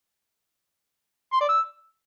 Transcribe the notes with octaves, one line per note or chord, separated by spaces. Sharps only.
C6
D5
E6